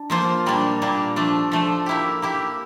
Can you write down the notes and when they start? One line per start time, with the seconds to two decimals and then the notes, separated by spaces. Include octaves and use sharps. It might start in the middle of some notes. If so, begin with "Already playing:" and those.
Already playing: D4
0.10 F3 A#3 F4 C5
0.46 A#2 G3 A#3 D4
0.82 A#2 G3 A#3 D4
1.16 F3 A3 D4
1.52 F3 A3 D4
1.86 A#3 E4 G4
2.22 A#3 E4 G4